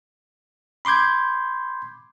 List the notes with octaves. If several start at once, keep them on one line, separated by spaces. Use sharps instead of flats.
B5 C6 D6 G6 G#6